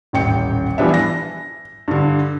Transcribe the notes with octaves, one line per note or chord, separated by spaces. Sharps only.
D#1 A1 G5 C#7
E3 F3 G3 B3 D4 E5
A#6
G2 D3